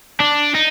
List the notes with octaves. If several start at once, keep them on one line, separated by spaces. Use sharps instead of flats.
D4
D#4